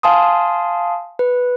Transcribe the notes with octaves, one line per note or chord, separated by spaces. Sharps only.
F5 G#5 A5 C6 D#6
B4